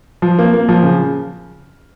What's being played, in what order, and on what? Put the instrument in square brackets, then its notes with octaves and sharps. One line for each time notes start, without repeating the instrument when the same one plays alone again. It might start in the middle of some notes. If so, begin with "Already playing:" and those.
[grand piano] F3
A#3
A#3
F3
C#3